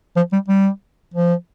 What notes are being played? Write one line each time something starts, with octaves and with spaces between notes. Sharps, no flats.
F3
G3
G3
F3